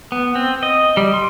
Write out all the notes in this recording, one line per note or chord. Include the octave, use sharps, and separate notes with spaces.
B3
C4
D#5
G3
C6